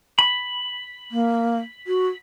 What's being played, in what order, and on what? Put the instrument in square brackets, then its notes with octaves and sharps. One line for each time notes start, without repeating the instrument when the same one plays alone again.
[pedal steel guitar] B5
[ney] A#3
F#4